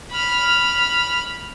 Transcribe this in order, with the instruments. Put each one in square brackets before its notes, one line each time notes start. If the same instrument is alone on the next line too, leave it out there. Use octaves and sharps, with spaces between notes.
[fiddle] B5 F6